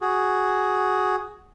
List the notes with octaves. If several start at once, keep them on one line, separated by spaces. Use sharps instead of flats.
F#4 G#4